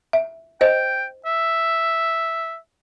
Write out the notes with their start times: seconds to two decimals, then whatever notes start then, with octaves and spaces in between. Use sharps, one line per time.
0.13 E5
0.61 C5 D#5 G5
1.25 E5